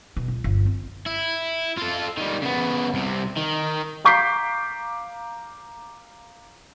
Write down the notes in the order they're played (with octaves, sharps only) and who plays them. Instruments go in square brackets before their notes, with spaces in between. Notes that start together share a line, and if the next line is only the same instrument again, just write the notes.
[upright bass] B2
C#2
G1
C4
[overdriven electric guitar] E4
F4 A4
D#3 G3
C#3 B3
C2 C3
D#3
[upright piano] F5 A#5 D6 G6 B6 C7